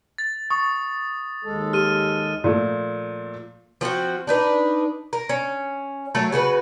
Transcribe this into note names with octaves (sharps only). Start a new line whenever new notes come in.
A6
C#6 D#6
D#2 G#3 A4
G4 F6 D#7
A#2 F3 A3
F3 C4 F4 F#4
D4 D#4 B4
A#4
C#4
F#3 A3 A4 A#4
C#3 F#4 A4 B4